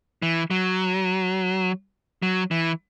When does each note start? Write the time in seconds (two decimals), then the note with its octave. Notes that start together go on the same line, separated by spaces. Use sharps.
0.22 E3
0.51 F#3
2.22 F#3
2.51 E3